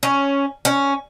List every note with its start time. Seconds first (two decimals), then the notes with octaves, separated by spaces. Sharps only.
0.03 C#4
0.65 C#4